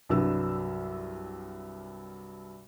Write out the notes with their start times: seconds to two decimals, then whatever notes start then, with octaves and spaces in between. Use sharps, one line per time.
0.09 C2 G2 F#3 E6